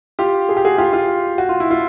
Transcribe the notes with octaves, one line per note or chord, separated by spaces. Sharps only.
F4 G4
G#4
G4
F#4 G#4
F4 G4
F4
F#4
F4
E4
F4